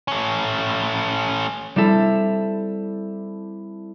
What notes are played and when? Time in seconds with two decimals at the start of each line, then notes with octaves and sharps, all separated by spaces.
0.08 A3 C#4
1.76 G3 C4 E4 A4